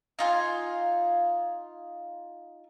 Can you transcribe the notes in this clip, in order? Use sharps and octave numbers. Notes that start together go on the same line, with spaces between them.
D#4 F4 G#5